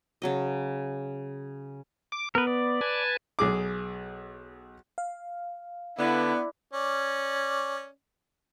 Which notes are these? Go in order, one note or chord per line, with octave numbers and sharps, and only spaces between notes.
C#3 F#3 D#5
D6
B3 A#4 B4
D5
B4 G#5 A5
B1 G#4 D6
F5
D3 B3 E4
C#4 D5